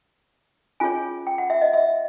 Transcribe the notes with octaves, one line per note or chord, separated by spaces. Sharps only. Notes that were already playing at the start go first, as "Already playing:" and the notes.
C#4 F4 G#4 C#5 G#5
G5
F#5
E5
D#5
E5